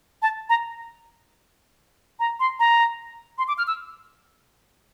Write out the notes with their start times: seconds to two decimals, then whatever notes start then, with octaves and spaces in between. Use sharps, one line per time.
0.22 A5
0.49 A#5
2.20 A#5
2.40 C6
2.60 A#5
3.38 C6
3.48 D6
3.58 F6
3.67 E6